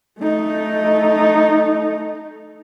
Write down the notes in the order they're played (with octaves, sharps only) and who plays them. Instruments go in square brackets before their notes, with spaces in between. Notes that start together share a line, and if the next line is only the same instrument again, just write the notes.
[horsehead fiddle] A3 D#4